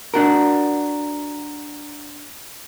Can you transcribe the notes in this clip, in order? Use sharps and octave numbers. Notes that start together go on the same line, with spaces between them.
D4 F#4 A#4